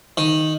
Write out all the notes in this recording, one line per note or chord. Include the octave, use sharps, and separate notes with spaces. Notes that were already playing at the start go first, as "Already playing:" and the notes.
D#3